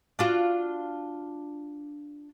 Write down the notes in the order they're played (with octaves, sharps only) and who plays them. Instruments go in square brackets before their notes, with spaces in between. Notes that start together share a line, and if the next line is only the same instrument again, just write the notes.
[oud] D4 F4 F#4